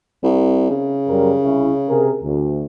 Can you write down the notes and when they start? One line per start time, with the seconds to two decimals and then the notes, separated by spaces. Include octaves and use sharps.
0.23 C2
0.70 C#3
1.09 F#2 G3 A#4
1.42 C2 C#4 E4
1.89 C3 G#4 A#4
2.23 D2